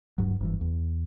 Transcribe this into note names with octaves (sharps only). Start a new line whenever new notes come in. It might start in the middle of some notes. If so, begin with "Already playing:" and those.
D1 G2 F#3
F#1 G2 E3
E2